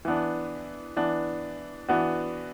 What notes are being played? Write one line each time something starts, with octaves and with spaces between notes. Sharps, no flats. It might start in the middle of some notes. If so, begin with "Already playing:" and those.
E3 B3 D4
E3 B3 D4
E3 B3 D4 F#4